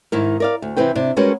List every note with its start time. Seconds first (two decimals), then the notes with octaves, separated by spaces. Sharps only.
0.12 G#2 D#3 E4 A#4
0.40 A#4 D5 F5
0.62 D2
0.77 C3 E3 C4 B4 G5
0.95 C3 D4
1.17 G3 G#3 C#4 F#4 A#4 B4